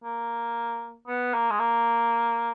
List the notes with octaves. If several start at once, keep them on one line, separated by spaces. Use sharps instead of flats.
A#3
B3
A#3
G#3
A#3